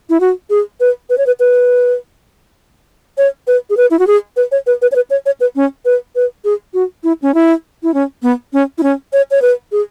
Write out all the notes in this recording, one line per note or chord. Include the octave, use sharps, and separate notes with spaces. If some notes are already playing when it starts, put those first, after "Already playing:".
E4
F#4
G#4
B4
B4
C#5
B4
B4
C#5
B4
G#4
B4
E4
F#4
G#4
B4
C#5
B4
B4
C#5
B4
C#5
C#5
B4
C#4
B4
B4
G#4
F#4
E4
C#4
E4
E4
C#4
B3
C#4
E4
C#4
C#5
C#5
B4
G#4